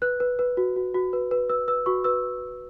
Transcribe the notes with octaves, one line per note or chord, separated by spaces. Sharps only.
B4 F#6
B4
B4
F#4
F#4
F#4
B4
B4
B4 E6
B4 E6
F#4 C#6
B4 E6